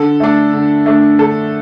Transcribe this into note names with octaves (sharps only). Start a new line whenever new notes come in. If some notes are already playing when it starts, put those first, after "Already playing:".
Already playing: D3 A4
A3 D4
D3
A3 D4
D3 A4